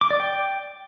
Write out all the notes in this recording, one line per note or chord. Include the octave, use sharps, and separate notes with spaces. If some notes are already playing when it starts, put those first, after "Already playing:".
D6
D5
G5